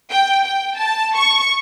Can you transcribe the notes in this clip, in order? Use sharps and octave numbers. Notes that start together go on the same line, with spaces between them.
G5
G5
A5
C#6